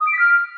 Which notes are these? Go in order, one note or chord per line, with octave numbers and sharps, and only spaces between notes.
D#6
D7
B6
F6